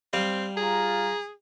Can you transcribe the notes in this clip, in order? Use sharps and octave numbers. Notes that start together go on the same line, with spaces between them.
G3 C4 F5
F4 G#4 A#5